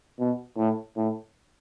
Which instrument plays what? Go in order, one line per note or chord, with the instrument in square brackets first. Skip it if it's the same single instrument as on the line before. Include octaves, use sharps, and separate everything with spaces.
[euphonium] B2
A2
A2